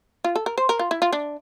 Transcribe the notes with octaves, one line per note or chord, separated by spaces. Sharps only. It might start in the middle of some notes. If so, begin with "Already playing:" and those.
F4
A4
A#4
C5
A#4
F4
E4
F4
D4